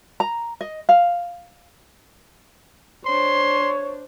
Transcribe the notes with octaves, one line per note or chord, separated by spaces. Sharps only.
A#5
D#5
F5
D4 C5 C#5 C6